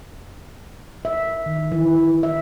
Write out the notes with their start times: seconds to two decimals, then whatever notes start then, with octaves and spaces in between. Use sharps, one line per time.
1.05 E5
1.46 D#3
1.72 E3
2.23 E5